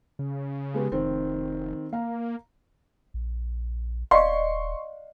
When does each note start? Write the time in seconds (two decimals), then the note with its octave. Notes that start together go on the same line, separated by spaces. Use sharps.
0.19 C#3
0.74 G#3 B3 G4
0.92 F1 D#3 C4
1.93 A#3 F5 A#5
3.14 A#1
4.11 D#1 D5 D#5 F5 C6 C#6